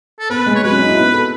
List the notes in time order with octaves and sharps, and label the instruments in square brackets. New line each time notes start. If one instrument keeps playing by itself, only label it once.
[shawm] A4
[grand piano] B3 [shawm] B4
[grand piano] G#3
[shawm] C#5
[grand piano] F#3 [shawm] B4
[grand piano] C#4
D#4
E4
B3
A4